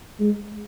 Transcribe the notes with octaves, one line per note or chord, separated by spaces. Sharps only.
G#3